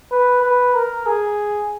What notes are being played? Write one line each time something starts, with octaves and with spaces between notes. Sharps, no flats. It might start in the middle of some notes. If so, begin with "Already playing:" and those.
B4
B4
A#4
G#4